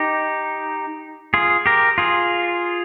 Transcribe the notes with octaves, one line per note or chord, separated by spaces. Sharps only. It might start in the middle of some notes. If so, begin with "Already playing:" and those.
Already playing: D#4 G4
F4 G#4
G4 A#4
F4 G#4